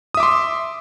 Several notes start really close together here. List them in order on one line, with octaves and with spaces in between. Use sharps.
D#6 E5 D6 C6